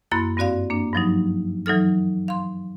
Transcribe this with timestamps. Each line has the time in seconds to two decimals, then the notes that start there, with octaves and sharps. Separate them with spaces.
0.11 F#2 A#3 E4 B5 C6 F#6
0.37 G2 C4 F#4 D5 F5
0.70 A#3 D4
0.93 G2 F3 F#3 D#4
1.66 E3 F#3 D#4 A4 F6
2.28 F5 C6